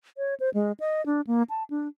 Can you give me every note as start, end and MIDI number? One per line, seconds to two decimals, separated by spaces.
0.17 0.34 73
0.40 0.50 72
0.54 0.72 56
0.80 1.04 75
1.06 1.21 62
1.27 1.43 58
1.50 1.63 81
1.70 1.88 62